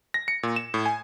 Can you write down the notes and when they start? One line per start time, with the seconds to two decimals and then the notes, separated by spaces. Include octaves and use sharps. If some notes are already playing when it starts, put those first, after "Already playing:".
0.14 A#6
0.28 C#7
0.43 A#2
0.56 E7
0.74 A2
0.86 G#5